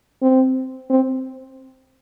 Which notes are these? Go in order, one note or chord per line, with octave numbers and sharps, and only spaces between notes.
C4
C4